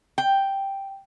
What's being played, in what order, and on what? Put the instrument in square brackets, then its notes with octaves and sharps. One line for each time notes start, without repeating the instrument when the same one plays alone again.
[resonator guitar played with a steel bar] G5